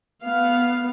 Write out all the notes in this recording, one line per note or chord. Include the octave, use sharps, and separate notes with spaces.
B3 F5